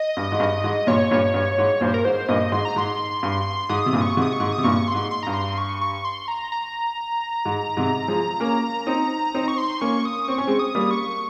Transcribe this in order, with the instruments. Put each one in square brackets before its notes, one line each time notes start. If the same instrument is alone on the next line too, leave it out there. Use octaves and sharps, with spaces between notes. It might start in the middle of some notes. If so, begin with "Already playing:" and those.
Already playing: [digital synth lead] D#5
[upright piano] G2
G#2
G2
G#2
[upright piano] G2 A#2 [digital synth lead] C#5
[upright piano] G2 A#2
G2
G#2
[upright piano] G2 A#2 [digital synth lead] C5
[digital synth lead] A#4
[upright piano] G#2 [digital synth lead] C5
[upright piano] G2 A#2 [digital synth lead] D#5
[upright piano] G#2 [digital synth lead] C6
[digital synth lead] A#5
[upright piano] G#2 [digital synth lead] C6
[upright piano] G2
[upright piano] G#2 [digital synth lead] D#6
[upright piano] C3
G2 A#2
[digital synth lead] C#6
[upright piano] G#2 C3
[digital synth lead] D#6
C#6
[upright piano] G#2
[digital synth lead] D#6
[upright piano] C3
[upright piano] G2 A#2 [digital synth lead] C#6
[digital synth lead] C6
[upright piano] G#2
[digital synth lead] C6
[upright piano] G2 [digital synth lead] A#5
[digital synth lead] C6
C#6
C#6
C6
A#5
A#5
[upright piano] G#2
G#2 C3
F3 G#3
A#3 C#4
C4 D#4
C4 D#4
[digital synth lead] C#6
C6
[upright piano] A#3 C#4 [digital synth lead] C#6
[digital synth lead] D#6
[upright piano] C4 [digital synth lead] C#6
[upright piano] C#4
G#3 C4
[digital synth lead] D#6
[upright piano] G3 A#3
[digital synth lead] C#6